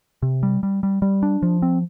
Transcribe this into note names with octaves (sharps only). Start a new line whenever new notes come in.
C3
G3
G3
G3
G3
D4
F3
C4